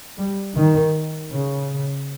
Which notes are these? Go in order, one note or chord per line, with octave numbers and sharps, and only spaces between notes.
G3
D#3
C#3